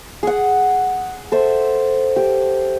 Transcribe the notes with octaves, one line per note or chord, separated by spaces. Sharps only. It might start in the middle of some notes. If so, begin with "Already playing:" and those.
G#4 F#5
A4 C5 E5
G4